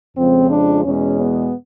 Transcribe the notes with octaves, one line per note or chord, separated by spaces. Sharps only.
F2 C#3 F3 G#3 C4
D4
E2 B2 G#3 C#4
B3